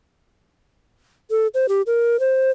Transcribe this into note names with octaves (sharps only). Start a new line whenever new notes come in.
A4
C5
G4
A#4
C5